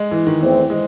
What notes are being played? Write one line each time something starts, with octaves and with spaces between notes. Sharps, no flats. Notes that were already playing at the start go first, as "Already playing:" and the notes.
Already playing: G#3
E3
D#3
E2 D#3 E3 A3 C4
G#3